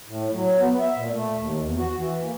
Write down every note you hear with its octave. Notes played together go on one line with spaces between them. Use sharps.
A2
F#3
B3
E5
A#2
A3
D#2
E2
F#4
E3
A#3